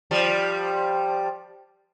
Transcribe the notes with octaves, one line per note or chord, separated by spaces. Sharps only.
F3 G3